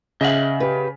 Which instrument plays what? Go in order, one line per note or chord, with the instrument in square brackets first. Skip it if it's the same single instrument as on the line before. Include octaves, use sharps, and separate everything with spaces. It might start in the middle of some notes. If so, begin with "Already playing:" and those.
[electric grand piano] C#3 [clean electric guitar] D#5 E5 F#5
[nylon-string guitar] G4 G#4 B4